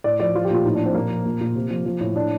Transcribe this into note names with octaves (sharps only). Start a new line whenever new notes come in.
A2 D5
F3 D5
F3 F4
G4
A#2 F4
A2 D#4
D4
F3
C4
A#2 A#3
F3
A#2
A#2
C3
F3
F3
A2
A2 D4